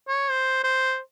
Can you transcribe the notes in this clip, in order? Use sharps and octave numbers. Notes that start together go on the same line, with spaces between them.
C#5
C5
C5